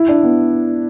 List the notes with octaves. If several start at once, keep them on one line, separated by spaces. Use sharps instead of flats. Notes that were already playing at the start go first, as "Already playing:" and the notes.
Already playing: E4
D4
B3